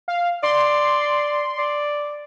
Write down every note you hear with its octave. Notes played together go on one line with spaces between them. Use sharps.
F5
D5 C6
D5